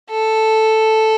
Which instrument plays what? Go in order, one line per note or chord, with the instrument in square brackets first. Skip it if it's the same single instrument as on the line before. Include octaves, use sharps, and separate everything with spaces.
[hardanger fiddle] A4